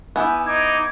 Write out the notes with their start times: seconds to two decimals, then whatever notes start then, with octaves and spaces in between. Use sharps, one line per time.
0.16 B3 E4 G4 G#5
0.46 D#4 D6 G#6